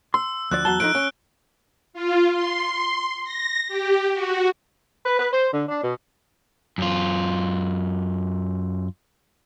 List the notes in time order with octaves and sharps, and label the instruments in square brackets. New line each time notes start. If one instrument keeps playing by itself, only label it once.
[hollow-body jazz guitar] C6 [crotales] E6
[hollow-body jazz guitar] D2 F3 D5 [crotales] F#6
[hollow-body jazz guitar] E2 F#3 A5 [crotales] G7
[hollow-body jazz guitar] F3 A3 D#4 [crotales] F#6 D7
[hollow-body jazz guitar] C#4
[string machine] F4
C6
A#6
G4
F#4
[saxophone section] B4
B4
C5
D3
D4
B2
[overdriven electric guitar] F#2 F4